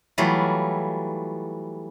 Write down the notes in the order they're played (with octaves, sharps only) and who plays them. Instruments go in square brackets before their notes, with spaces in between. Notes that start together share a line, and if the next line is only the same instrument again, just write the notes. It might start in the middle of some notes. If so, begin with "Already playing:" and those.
[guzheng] E3 F#3 G3 A3 F4